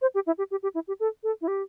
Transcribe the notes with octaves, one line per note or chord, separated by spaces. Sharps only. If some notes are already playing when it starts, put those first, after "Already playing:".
C5
G4
E4
G4
G4
G4
E4
G4
A4
A4
E4
G4